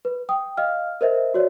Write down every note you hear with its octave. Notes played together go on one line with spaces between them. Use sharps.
B4
G5 D#6
D#5 F5 F6
A#4 C5 D#5 E5
F#4 C#5 D5